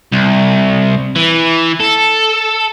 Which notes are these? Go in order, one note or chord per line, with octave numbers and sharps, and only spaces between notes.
C2
E3
A4